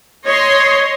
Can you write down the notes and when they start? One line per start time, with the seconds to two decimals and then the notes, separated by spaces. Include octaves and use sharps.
0.25 C#5 D#5 C6